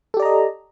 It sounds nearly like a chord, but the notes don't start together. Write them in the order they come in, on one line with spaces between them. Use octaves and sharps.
A4 G4 D5 A#5 D#5